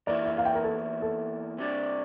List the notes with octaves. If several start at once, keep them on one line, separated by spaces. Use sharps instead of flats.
E2 E3 A#3 E4 D5
E5
F5
G5
A#4
A4
A4
C3 G3 D4